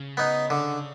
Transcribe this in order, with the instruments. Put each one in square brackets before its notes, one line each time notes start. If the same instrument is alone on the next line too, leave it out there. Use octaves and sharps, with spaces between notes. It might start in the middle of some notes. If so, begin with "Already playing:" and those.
Already playing: [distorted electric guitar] C#3
[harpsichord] B3 D#4
D3